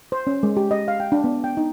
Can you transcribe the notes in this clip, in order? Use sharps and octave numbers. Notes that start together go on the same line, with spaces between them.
C5
C#4
G#3
G4
D#5
F5
G5
D4
B3
G5
D#4